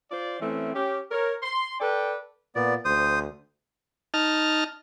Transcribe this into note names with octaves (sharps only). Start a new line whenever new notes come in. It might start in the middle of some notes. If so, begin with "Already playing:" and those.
F4 C5 D5
E3 A3 C4 C#4
C#4 G4
A#4 C#5
C6
A4 B4 D5 G5
A#2 B3 D5
D2 C5 D#6
D#4 A5 F6